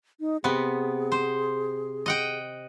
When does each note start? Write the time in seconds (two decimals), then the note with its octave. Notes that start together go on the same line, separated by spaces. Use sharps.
0.20 D#4
0.44 C3 B3 G#4
1.12 C5
2.06 D#5 F#5 G5